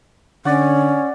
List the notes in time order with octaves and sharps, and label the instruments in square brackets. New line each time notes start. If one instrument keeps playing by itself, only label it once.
[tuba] D3 [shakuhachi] C#4 [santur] D5 F#5